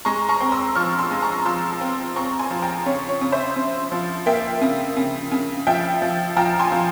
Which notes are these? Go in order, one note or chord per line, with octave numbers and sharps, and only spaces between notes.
G#3 A#5 C#6
A#5 C#6
C4
C6 E6
F3 C#6 F6
C6 E6
G#3
A#5 C#6
F3 C6 E6
C4
C4 A#5 C#6
G#5 C6
F3
G5 A#5
C#3 C#5
C#5
C#3
C5 E5
C#3
F3
A#3 E5 G5
C#3
C#3
C#3
F3 E5 G5
F3
F3 G5 A#5
G#5 C6
F3